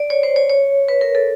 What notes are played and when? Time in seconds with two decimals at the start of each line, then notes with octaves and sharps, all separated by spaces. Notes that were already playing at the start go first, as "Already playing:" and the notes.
Already playing: D5
0.10 C#5
0.23 C5
0.36 C#5
0.50 C#5
0.88 B4
1.01 A#4
1.15 A4